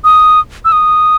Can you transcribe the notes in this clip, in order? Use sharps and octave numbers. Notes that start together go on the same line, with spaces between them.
D#6
E6
D#6